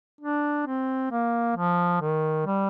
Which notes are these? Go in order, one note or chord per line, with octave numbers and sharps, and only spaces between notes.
D4
C4
A#3
F3
D#3
G3